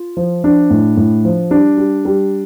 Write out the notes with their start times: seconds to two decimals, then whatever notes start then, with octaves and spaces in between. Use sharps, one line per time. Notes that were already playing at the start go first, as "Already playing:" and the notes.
Already playing: F4
0.17 F3
0.44 F3 D4
0.70 A2
0.97 A2
1.25 F3
1.51 G3 D4
1.77 G3
2.05 G3